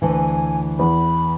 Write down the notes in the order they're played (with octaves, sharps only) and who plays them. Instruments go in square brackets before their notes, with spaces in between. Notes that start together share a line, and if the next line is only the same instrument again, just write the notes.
[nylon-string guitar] D2 E3 [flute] G#5
[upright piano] E2 [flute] B5